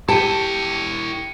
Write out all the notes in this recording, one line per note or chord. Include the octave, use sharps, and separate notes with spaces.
E4 G4 G5 A5 C#7 D#7